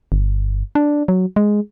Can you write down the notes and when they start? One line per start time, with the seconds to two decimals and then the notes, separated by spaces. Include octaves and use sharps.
0.12 G1
0.75 D4
1.08 F#3
1.36 G#3